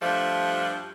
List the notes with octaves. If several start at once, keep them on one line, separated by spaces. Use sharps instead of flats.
G2 F3 G3 A3